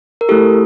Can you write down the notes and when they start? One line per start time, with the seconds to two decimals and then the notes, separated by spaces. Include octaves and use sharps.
0.21 A#4
0.29 A3 E4 G4 A4